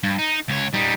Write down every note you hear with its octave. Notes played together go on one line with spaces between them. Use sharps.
G2
D#4
C#2 C#5
G3 D#4